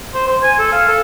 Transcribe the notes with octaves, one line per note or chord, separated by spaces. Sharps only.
C5
C5
G#5
A4
F5
A4